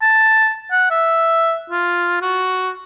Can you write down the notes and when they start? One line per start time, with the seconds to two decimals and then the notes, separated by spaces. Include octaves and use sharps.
0.02 A5
0.71 F#5
0.91 E5
1.70 F4
2.22 F#4